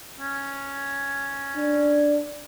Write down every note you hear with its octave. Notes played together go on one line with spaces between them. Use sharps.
C#4
D4